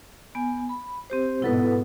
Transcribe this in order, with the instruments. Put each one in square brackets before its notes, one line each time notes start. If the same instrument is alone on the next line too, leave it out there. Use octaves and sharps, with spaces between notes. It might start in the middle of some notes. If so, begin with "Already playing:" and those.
[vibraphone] B3 G#5
B5
C4 G4 C5
[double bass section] G#2 B2 B3 [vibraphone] E4 A4 B4